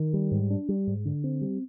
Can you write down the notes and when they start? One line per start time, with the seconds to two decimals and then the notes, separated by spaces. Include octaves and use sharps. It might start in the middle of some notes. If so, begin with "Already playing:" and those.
Already playing: D#3
0.13 G3
0.31 G#2
0.50 D4
0.69 G3
0.87 G#2
1.05 D3
1.24 C4
1.41 G3